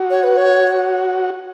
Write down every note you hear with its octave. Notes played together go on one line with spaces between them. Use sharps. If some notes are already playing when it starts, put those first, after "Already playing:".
Already playing: F#4
C#5
B4
C#5